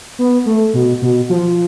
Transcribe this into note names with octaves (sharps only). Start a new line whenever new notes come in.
B3
A3
B2
B2
F3